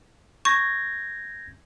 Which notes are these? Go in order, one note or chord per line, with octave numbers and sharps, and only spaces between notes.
C#6 G6 G#6 A#6